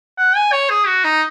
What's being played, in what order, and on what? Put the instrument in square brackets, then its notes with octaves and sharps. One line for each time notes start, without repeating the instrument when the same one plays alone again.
[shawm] F#5
G#5
C#5
G#4
F#4
D#4